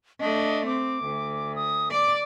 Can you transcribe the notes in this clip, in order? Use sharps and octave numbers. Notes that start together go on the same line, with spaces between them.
A3 D4 D#5
C4 D6
D2
D#6
D5 D6